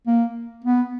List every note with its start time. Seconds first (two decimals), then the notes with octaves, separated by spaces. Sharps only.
0.07 A#3
0.64 B3